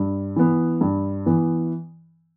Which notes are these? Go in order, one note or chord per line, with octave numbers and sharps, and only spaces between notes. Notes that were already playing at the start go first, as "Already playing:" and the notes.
Already playing: G2
E3 B3
G2
E3 B3